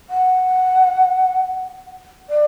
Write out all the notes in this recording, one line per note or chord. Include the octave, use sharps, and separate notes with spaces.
F#5
D5